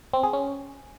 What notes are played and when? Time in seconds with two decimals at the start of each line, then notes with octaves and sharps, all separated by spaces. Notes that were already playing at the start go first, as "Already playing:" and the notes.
0.13 C4
0.23 G#4
0.33 C#4